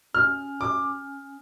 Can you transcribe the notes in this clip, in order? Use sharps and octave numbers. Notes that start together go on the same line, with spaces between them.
C#4 F6
D6